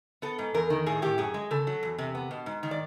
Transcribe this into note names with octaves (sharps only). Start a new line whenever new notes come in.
B3 A4
G#2
E2 A#4
D#3
A2 G#4
A2 G4
F#2 G#4
G#3
C#3 A4
F#3
E2
C3
B3
B2
G#2
D#3
D5